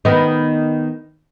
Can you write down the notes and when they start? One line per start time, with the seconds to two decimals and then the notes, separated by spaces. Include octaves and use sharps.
0.05 D#3 B3